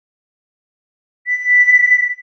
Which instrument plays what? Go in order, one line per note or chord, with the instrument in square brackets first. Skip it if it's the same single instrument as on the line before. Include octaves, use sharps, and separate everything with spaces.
[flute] B6